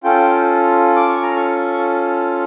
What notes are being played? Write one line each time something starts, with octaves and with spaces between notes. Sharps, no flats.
C#4 F4 A4 G5
D6
C#6
A#5
C#6